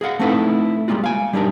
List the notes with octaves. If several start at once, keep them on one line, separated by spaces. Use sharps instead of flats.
G#4 D#5 F5 F#5
A3 C4 D#4 E4 A4 B4
G3 G#3 A#3 F4 F#4
F5 G#5
G3 D4 D#4 G4 A#4